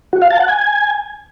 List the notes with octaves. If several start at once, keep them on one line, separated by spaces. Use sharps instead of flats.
F#4
F5
A5
F#5
G#5